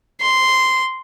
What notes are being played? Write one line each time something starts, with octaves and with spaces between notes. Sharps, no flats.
C6